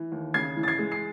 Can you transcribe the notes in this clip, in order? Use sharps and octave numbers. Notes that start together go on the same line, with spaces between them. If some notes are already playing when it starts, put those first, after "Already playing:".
Already playing: E3
D#2
C#3 G#6 C7
E3
A6
G#6 C7
G#3
C7